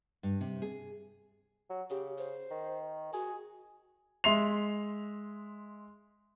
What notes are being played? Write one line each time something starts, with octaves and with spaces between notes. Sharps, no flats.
G2
C3
G#4
F#3
C#3 G4
C5
D#3
F#4 G#4
G#3 E5 C6 C7 F7